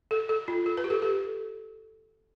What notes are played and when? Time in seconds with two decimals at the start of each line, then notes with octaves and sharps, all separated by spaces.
0.11 A4
0.29 A4
0.48 F4
0.66 A4
0.77 B4
0.84 G4
0.90 A4
1.02 A4